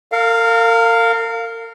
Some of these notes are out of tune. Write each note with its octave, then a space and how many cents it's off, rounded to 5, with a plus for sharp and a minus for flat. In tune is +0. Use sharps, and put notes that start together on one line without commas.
A#4 -40 F5 +0